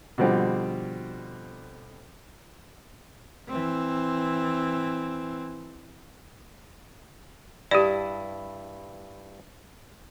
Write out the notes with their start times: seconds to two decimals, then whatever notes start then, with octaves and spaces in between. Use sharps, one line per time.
0.18 B2 D3 F3 G3 C4
3.48 E3 C4
7.71 G2 E4 G4 D5 A5